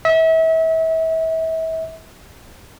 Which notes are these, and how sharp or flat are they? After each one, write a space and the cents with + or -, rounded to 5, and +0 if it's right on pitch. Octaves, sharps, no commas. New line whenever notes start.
E5 -35